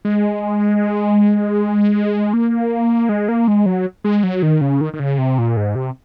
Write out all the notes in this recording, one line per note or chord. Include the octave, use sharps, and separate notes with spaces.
G#3
A#3
G#3
A#3
G#3
F#3
G#3
F#3
D#3
C#3
D#3
D#3
C#3
C3
A#2
G#2
C3